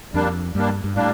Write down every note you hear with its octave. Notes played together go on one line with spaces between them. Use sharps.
F2 G3 A#3 D4
G2 G3 A#3 D4
G2
A2 G3 A#3 D4